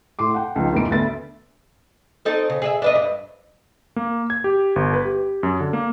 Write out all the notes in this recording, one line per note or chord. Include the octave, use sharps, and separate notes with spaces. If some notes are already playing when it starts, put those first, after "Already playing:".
A2 C6 D6
F#5 G5
C#2 F3 D#4
E2 G#2 E3 B3 A#4 D7
D2 B3 E5 A6
C4 D#4 A4
C#3
G#4 D#5 E5
D4 B4 D#5
G2
A#3
G#6
G4
G1
B4
G4
F#2
D3
A#3